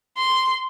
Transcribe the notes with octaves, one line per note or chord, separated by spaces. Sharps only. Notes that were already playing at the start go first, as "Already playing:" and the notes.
C6